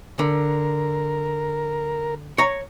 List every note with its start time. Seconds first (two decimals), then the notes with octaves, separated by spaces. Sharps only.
0.19 D3 A#4
2.38 C#5 A#5